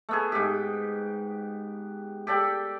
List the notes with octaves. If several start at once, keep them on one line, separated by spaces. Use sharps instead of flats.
A3 B3 G#4
G#2 G4
G4 A4 D5 G5